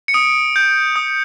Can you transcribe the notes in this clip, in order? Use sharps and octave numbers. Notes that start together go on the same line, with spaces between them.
C#7
D#6 D7
G6
D#6